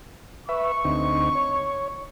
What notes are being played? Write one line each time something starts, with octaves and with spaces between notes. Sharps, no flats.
B4 E5 C#6
D2 C4 D#4
C#5